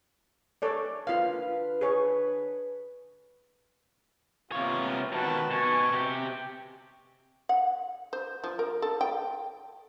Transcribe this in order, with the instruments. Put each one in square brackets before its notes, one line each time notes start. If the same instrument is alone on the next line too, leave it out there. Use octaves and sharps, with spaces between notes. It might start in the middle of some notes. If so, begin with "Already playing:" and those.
[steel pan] A4 C#5 D5
[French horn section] D3 B4 [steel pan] F4 F5
[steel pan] G#4 C#5
[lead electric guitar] C3 C#5 [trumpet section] A#3 B3 F4
[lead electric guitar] B2 D#3 [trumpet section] F#4 B4 A5
[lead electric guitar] B2 [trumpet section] G#5 C#6
[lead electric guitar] C3 G4
[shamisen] F#5
C5
F3
A#4
A4
G5